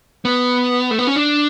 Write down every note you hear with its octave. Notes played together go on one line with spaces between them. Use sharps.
B3
A3
B3
C#4
D4